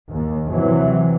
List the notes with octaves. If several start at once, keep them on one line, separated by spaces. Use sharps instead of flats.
D#2
C3 E3 F#3